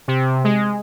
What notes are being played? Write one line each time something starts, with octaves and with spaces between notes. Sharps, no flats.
C3
G#3